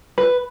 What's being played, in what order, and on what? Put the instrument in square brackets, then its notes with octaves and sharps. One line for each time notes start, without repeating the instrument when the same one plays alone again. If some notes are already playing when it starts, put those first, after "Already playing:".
[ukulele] B4